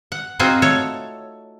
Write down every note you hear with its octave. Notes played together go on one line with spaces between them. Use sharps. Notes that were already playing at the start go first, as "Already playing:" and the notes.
F#5
C4 D#4 F4 F#4 G#4 F#5
A3 A4 C#5